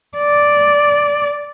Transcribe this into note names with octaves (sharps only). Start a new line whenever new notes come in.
D5